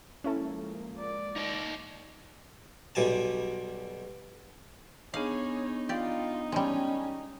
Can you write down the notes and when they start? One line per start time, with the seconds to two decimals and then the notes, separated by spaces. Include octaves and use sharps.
0.24 F3 G#3 A#3 C#4 E4 A4
0.99 D5
1.36 D#4 C#5
2.95 B1 B2 G3 G#5 A5
5.14 B3 D4 D#4 G#4 C#5 F5
5.89 F4 G4 D5
6.52 G3 G#3 C#4